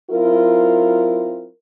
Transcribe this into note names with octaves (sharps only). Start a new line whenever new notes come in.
F#3 C4 E4 F4 A#4